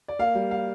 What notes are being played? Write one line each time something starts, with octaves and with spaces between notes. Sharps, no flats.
D5
A#3 F5
G3
F5